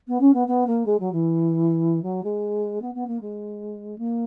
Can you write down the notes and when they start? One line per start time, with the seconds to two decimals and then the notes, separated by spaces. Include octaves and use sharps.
0.08 B3
0.20 C#4
0.34 B3
0.48 B3
0.67 A#3
0.86 G#3
0.99 F#3
1.12 E3
2.03 F#3
2.23 G#3
2.82 B3
2.94 B3
3.07 A#3
3.21 G#3
3.98 A#3